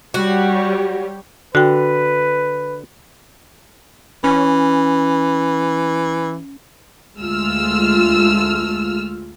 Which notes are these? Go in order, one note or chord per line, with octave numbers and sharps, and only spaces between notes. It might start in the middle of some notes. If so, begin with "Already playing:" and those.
G3 F#4 G4 C#5
D3 F#4 B4 G5
E3 C#4
D2 G#3 A3 F4 E6 F6